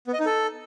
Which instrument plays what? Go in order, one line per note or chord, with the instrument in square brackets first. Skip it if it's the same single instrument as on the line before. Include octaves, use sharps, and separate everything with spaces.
[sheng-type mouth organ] B3
D#5
D#4
A4